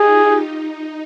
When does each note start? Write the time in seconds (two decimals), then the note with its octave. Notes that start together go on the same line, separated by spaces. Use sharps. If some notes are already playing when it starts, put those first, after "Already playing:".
Already playing: D#4 F4 G4 G#4
0.25 D#4